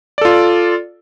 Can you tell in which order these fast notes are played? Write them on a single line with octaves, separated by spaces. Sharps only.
D5 A4 F4